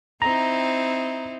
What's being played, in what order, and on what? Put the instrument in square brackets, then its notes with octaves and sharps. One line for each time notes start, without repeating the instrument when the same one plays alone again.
[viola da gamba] C4 D#4 E4 [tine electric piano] A#5